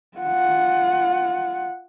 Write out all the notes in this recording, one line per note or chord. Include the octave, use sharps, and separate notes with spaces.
F4 F#5